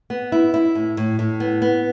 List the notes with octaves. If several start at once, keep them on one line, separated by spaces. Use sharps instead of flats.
B3
E4
E4
A2
A2
A2
B3
B3